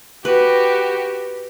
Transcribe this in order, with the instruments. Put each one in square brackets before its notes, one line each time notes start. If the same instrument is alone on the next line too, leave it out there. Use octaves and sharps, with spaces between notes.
[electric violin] F#4 G4 [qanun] B4